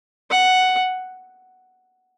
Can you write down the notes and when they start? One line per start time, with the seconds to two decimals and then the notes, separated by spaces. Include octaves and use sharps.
0.30 F#5